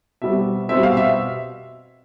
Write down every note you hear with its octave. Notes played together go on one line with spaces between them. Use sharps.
B2 G3 C4 E5
B2 G3 C4 E5
F5
E5